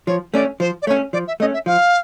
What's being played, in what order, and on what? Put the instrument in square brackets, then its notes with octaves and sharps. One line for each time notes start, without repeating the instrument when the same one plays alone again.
[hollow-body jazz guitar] F3 [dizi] C#5
[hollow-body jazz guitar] A3 C#4 [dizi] D5
[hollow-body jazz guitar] F3 [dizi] C5
[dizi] D5
[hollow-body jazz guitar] A3 C#4 [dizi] C#5
[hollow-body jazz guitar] F3 [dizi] D5
[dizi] E5
[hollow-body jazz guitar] A3 C#4 [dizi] D#5
[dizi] E5
[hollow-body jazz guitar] F3 [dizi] F5